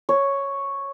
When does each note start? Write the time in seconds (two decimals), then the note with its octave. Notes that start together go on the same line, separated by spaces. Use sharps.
0.09 C#5